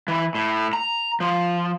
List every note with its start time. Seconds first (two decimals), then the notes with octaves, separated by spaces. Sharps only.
0.08 E3
0.35 A2
0.73 A#5
1.20 F3